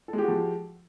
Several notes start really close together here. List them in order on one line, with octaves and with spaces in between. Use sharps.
A4 G#3 G4 F#4 F3